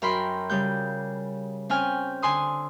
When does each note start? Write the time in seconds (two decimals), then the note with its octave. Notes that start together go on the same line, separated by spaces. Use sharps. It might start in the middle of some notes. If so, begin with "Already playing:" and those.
0.02 F#2 A#4 G5 B5 C6
0.50 C#3 G3 G6
1.69 C4 C#4 G5 G#5 F6
2.22 D3 G#5 C6 D#6